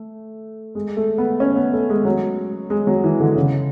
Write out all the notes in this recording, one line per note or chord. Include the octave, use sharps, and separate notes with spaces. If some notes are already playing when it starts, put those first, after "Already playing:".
Already playing: A3
G#3
A3
B3
C#4
B3
A3
G#3
F#3
G#3
F#3
E3
D3
C#3